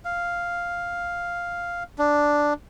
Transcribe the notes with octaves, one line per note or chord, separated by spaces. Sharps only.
F5
D4